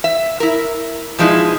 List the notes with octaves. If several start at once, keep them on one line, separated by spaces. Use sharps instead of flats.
E5
E4 A#4
B2 F3 G#3 D#4 E4